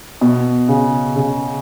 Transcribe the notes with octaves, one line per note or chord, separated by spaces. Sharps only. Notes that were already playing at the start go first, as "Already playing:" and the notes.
B2
C#3
C#3